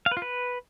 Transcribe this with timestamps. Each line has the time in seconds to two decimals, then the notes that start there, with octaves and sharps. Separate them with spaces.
0.06 F5
0.11 B4
0.17 F4
0.22 B4